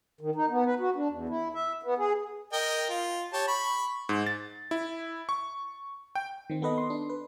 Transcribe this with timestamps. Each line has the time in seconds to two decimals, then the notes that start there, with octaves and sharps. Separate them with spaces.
0.21 D#3
0.35 D#4
0.50 B3
0.65 B4
0.80 F#4
0.96 D4
1.09 E2
1.29 E4
1.54 E5
1.83 B3
1.98 G#4
2.53 A#4 D#5 G5
2.89 F4
3.33 G4 C#5 A5
3.48 B5 C#6
4.09 G#2
4.26 A6
4.71 E4
5.29 C#6
6.15 G5
6.50 D#3 C4
6.62 B3 A4 B4 D#5
6.78 C6
6.90 D4
7.09 B4